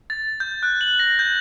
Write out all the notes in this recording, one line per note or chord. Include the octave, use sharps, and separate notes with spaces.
A6
G6
F#6
F#7
A#6
G6